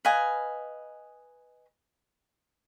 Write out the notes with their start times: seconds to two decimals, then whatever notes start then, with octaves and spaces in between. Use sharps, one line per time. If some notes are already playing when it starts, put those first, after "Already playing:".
0.05 B4 D#5 F5 G#5